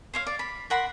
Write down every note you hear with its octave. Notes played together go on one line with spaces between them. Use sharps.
C5 C#5 F5
D5
B5
A#4 F#5 B5 C6